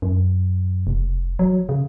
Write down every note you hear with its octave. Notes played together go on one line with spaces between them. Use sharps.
F#2
F1
F#3
C#3